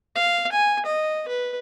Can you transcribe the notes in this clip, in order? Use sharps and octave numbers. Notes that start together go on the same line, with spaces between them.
F5
G#5
D#5
B4